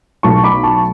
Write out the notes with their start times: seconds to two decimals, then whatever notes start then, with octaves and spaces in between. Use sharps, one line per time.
0.23 B1 B2 F#3 A3 A5 C#6
0.44 B5 D6
0.63 A5 C#6